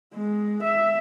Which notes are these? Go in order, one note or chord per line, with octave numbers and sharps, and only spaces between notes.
G#3
E5